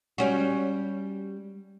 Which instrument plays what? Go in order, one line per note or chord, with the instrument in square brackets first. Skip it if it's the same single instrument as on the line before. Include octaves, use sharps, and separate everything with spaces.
[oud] G3 C#4 F#4